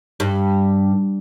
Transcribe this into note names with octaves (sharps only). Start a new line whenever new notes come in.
G2